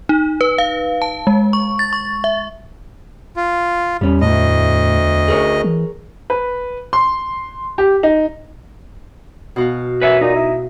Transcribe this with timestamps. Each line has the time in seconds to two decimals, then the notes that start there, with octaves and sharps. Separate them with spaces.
0.09 D#4
0.41 B4
0.58 F5
1.02 A5
1.27 G#3
1.53 C#6
1.79 A6
1.93 C#6
2.24 E5
3.36 F4
4.01 E2 G3 C#4
4.21 D2 A2 D#5
5.28 G#4 A#4 C#5
5.64 E3
6.30 B4
6.93 C6
7.78 G4
8.03 D#4
9.56 B2 F#4 F5
10.01 F#2 B4 C#5 E5
10.21 A#2 D#4
10.36 E4